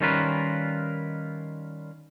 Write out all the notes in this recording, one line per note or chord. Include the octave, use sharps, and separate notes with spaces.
D#3 G3 C#4 F4 A#4 B4